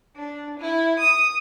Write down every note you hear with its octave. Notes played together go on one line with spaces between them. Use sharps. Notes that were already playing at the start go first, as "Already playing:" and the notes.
D4
E4
D#6